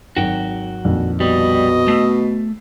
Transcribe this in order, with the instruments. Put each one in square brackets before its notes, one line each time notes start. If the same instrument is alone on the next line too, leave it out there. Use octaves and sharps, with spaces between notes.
[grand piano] G#1 D#3 F#3 [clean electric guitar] F#4 G5
[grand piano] A#1 F2 D#3
[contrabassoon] B2 [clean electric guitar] G3 [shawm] D#5
[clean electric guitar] A3 [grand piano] E6 B6 C7